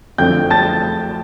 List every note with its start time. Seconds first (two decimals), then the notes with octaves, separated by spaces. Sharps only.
0.18 F2 D3 F3 A3 G5 G6
0.50 A5 A6